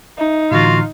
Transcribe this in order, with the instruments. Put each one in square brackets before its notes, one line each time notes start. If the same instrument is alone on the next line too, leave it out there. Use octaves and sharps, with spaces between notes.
[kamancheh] D#4 [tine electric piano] E5
[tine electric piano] A2 D3 E3 [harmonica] F4 F5 [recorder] F#4